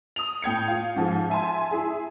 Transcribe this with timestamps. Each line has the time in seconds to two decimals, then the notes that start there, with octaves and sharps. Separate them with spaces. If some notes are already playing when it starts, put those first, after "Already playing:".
0.16 D#6 F7
0.42 A2 G5 G#6 C#7
0.68 F4
0.96 G#2 F3 G#4
1.30 E5 G#5 A5 C6
1.71 E4 G#4